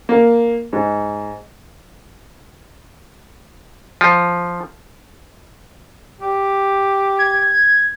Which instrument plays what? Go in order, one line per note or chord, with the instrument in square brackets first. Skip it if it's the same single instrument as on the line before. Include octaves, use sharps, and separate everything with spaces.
[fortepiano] A#3
G#2
[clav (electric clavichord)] F3
[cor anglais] G4
[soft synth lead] G#6